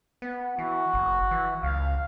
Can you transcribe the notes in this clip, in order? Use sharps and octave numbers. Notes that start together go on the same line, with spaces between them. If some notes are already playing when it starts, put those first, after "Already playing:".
B3
E3 F#4
F#1
E3
C#2 F5